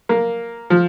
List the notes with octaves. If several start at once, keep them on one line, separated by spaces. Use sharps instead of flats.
A#3
F3